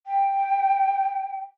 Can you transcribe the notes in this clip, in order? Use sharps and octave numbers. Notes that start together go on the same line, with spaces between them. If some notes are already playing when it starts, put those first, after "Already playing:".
G5